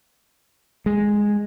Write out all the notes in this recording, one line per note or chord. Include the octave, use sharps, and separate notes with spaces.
G#3